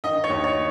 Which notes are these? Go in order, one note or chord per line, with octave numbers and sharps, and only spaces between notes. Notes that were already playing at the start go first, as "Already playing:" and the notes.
D#3 D#5
C#5
D#2
C#5